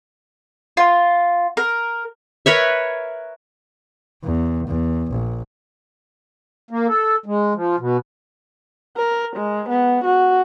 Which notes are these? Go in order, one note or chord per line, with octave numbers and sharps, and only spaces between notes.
F4
A#4
A#4 B4 C#5 E5
E2
E2
A#1
A#3
A4
G#3
F3
B2
A#4
G#3
B3
F#4